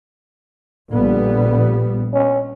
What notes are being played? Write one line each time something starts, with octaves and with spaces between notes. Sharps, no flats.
A#1 D3 G3 B3
C#4